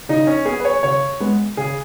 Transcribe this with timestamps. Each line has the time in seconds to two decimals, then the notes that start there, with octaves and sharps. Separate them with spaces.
0.09 C#3 D#4
0.27 C#4
0.45 B3 G#4
0.60 B4
0.65 C#5
0.83 C#3 C#5
1.20 G#3 B3
1.57 C#3 G#4